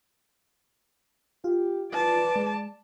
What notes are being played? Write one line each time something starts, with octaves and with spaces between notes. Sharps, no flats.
F4 G4
B4 D5 A5
G#3